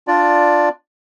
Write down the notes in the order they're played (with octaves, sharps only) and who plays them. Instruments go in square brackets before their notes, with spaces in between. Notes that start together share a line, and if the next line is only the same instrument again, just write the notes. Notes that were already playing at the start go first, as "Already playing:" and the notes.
[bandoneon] D4 F4 D5